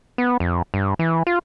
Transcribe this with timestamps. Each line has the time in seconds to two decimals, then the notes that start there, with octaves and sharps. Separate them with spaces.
0.18 B3
0.40 F2
0.74 G2
0.99 E3
1.27 F4